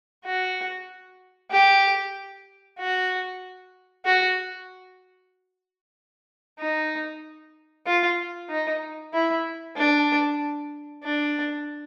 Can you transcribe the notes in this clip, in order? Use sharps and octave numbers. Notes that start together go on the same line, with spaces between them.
F#4
G4
F#4
F#4
D#4
F4
D#4
E4
D4
D4